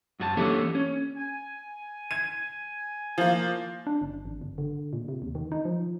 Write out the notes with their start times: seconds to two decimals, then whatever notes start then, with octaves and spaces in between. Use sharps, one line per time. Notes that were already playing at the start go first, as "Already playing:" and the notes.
0.20 F#2 F#4 A5
0.37 E3 A#3 C#4 D4 G4 A4
0.75 C#4
1.17 G#5
2.11 G#6 D#7
3.18 F3 A#3
3.87 D4
4.02 G1
4.25 G#1
4.42 G1
4.58 D3
4.93 A#2
5.08 C3
5.22 D#2
5.35 D#3
5.52 D#4
5.65 F3